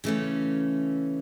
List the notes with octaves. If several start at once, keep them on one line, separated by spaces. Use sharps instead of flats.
C#3 E3 A3 C#4